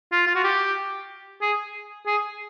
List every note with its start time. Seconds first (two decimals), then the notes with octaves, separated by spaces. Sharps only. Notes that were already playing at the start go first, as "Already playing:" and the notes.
0.12 F4
0.27 F4
0.35 F#4
0.44 G4
1.41 G#4
2.06 G#4